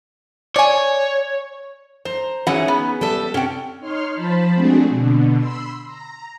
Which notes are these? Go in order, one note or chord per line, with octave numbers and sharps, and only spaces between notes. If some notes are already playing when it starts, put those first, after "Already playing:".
C#5 D5 G#5
C5 A#5
E3 F#3 C#4 D#4 G#4 F#5
B3
G3 A4 E5
C3 C#4 F#5 G5
D#4 C#5 C6 F6
F3 C5 A5 B5
G#3 A3 C4 D4 F#4 G#4
B2 D3
B5 C6 E6
A#5